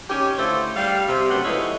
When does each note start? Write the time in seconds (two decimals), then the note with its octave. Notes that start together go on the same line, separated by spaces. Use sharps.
0.10 D#3 C#4 G4
0.39 D3 A3 E4 F4 A4 C5
0.76 G3 F5
1.08 C3
1.31 F#2 A3 B3 C#4 C5 F#5
1.45 F3 G#3 A3 D#4 E4 C#5